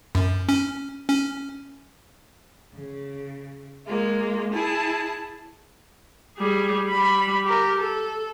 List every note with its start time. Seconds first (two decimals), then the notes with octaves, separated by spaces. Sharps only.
0.15 F#2
0.49 C#4
1.08 C#4
2.75 C#3
3.86 G#3 A#3 F4
4.53 E4 G#4 A5
6.37 G3 G#4
6.89 G3 B5
7.45 G4 A#4
7.79 A4